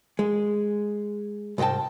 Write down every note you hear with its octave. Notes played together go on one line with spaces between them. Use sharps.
G#3
C2 G#2 D#5 G5 A5